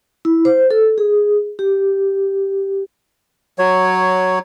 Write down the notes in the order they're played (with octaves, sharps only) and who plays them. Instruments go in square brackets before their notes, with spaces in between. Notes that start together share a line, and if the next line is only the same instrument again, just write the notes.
[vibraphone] E4
C5
A4
G#4
G4
[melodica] F#3 C#5